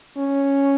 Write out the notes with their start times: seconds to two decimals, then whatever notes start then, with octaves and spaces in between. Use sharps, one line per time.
0.17 C#4